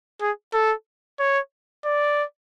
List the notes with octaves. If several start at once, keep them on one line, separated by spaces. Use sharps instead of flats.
G#4
A4
C#5
D5